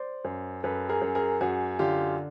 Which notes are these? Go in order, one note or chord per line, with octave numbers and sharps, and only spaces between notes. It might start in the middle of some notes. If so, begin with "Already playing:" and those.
Already playing: C5 D5
F#2
F#2 A4 B4
G#4 A#4
F#2
G#4 A#4
F#2 F#4 G#4
D3 F4 G4